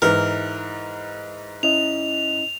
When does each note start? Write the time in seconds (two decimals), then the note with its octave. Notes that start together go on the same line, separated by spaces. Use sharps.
0.02 G#2 E3 A#4
1.63 C#4 E4 D#5 F7